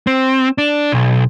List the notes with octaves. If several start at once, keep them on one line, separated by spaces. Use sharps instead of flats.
C4
D4
B1